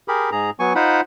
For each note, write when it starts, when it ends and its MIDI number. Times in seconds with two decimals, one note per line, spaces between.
0.08 0.30 67
0.08 0.30 68
0.08 0.30 70
0.08 0.30 83
0.32 0.50 44
0.32 0.50 68
0.32 0.50 82
0.60 0.73 54
0.60 0.73 59
0.60 0.73 80
0.60 0.73 85
0.75 1.01 63
0.75 1.01 65
0.75 1.01 72
0.75 1.01 78
0.75 1.01 83